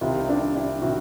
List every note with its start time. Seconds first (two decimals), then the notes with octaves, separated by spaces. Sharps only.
0.01 C2 C3 D#3 D#4 F4
0.28 D4 E4
0.55 D4 E4
0.82 C3 D#3 E4 F#4